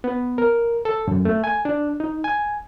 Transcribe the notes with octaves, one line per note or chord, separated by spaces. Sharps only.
B3
A#4
A4
F#2
A3
G#5
D4
D#4
G#5